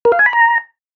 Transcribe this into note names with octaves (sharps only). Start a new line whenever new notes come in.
A#4
F5
G#5
B5
A#5